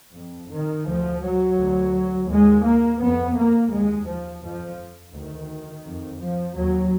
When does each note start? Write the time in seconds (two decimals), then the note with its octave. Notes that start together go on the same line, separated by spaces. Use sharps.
0.15 F2
0.51 D#3
0.86 D2 F3
1.22 F#3
1.57 D2
2.28 D#2 G#3
2.64 A#3
2.99 F2 B3
3.35 A#3
3.71 D#2 G#3
4.06 F3
4.42 F2 F3
5.13 D2 D#3
5.85 F2
6.19 F3
6.55 D#2 F#3